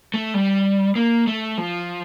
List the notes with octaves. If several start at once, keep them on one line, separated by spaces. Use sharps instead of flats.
A3
G3
A#3
A3
F3